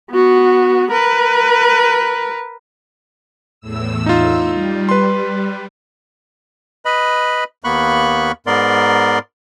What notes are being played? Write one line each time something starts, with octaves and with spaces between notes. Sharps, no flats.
B3 F#4
A#4 B4
E2 A2 E6
D#4 F4
G3
B4 C6
B4 D#5 B5
D#2 A#3 B3 B5 C#6 F#6
G#2 B3 A#4 D5 C6